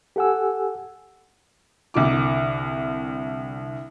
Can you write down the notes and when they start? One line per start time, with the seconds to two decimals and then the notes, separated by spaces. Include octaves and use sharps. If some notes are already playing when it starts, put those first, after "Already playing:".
0.16 G4 A4 F#5 G#5 E6
1.94 C2 D3 D6